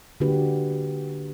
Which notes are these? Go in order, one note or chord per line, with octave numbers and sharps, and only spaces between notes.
D3 A#3 D4 F#4 G4 B4